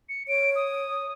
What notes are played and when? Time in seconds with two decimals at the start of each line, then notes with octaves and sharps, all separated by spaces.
0.09 C#7
0.28 C#5 D7
0.55 D#6